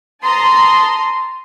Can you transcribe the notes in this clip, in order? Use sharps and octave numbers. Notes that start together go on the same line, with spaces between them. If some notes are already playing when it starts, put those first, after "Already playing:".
A5 A#5 C6 D#6